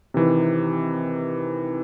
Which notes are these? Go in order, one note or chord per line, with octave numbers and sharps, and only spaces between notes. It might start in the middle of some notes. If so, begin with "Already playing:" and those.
C3 D#3 E3